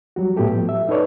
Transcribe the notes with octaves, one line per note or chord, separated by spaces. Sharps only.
F#3 G3 F#4
A2 B3 E4 G4 A4
F3
E5
D#4 A4 B4 C#5 D5